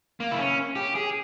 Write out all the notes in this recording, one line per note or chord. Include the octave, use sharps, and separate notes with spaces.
A#3
E4
C#4
G4
G#4